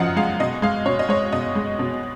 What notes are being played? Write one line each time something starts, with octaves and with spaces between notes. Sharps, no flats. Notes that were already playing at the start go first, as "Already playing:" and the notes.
Already playing: F#2 C#3 F3 D#5 F5 F#5
G#3 F5
B2 D#5
G#3 F5
B2 C#5
D#5
G#3 C#5
B2 D#5
G#3
B2